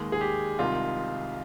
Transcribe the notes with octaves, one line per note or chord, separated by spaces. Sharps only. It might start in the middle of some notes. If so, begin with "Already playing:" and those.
Already playing: D#2 D#3 G#3
G#4
G4
C2 C3 D#3 G#3 F4